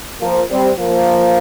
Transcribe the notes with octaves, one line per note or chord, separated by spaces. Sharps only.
F3 A#3
G3 C4
F3 A#3